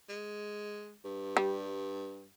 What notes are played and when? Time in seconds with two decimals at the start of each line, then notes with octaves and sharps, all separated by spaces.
0.09 G#3
1.05 G2
1.37 G3